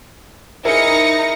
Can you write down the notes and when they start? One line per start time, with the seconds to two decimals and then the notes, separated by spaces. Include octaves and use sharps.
0.65 D#4 E4 G#4 A#4 A#6 C#7